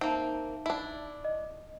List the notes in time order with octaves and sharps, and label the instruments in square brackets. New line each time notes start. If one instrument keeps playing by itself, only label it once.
[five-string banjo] A#3 C4 [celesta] D#4 E5 A5
[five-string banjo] D4 E4
[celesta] D#5